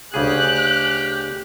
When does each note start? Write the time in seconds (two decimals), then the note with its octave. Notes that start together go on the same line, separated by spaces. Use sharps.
0.14 D2 C#3 G4 G#4 F#6